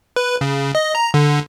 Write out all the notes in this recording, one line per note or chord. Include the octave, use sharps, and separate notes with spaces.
B4
C#3
D#5
A#5
D3